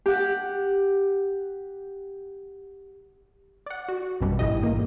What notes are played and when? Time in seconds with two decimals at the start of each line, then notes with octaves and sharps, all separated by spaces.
0.06 G4 F#5
3.66 D5 F#5
3.89 F#4
4.21 A1 F#2 B2 G3
4.39 G1 G#2 E4 G4 D#5
4.63 A1 A#3